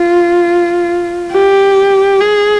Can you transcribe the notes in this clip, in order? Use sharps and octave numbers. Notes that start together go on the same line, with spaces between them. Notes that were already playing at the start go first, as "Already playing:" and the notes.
Already playing: F4
G4
G#4